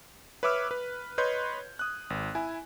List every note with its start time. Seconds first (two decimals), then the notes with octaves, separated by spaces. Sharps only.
0.43 B4 C#5 E5 D6 E6 F6
0.71 B4
1.18 B4 C#5 D#5 C6 G6 G#6
1.79 D#6 F#6
2.10 G#1
2.35 E4 G#5